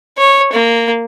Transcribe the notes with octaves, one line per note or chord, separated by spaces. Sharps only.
C#5
A#3